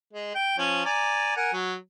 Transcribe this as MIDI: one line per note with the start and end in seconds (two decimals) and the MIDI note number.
0.13 0.31 56
0.35 0.57 79
0.58 0.81 53
0.58 0.81 61
0.85 1.36 74
0.85 1.36 80
0.85 1.36 82
1.36 1.52 70
1.36 1.52 78
1.36 1.52 80
1.52 1.75 54